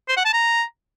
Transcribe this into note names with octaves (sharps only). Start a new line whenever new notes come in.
C5
F#5
A5
A#5